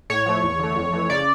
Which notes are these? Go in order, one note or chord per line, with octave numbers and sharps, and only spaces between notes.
A2 C#5
F3 A3
E2
D3 A3
F2
E3 A3
C#3 D5